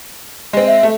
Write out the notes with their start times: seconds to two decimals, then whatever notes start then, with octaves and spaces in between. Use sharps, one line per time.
0.53 G#3 C4
0.67 E5
0.83 A3